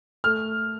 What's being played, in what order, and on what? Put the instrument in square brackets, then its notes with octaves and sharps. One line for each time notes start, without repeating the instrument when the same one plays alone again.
[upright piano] A3 F6